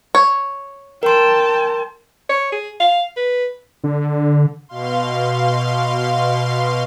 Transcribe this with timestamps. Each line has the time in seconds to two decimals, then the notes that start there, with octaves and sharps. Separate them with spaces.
0.15 C#5
1.03 A#4 G5 A5 C6
2.29 C#5
2.52 G#4
2.80 F5
3.17 B4
3.84 D3
4.69 B2 F5 C6